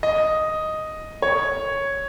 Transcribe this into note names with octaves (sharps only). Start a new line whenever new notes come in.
D#5
C#5